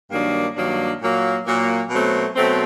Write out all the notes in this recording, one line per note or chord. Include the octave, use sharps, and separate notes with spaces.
G2 D#3 F#3 A#3 D4
G2 D#3 F#3 A#3 D4
A#2 F#3 A#3
A#2 F#3 A#3
B2 F#3 A3 C4
B2 F#3 A3 C4